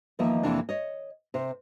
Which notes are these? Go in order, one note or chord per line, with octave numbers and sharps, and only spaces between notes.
E2 D#3 F3 A#3 D#5 E5
F2 C3 E3 A#3 D4
C#5 D#5
C3 C5